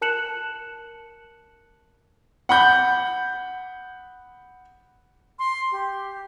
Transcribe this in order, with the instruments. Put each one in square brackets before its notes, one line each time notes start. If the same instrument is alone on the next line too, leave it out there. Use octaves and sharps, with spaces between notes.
[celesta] A#4 A5 F#6 C#7 E7 F#7
[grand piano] F#5 B5 G6
[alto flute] C6
G4